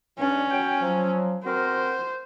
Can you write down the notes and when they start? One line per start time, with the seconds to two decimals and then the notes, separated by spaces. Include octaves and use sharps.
0.19 G2 C#4 D4
0.51 F#3 G5
0.81 F3 F#3
1.45 C4 F#4 A#4 C5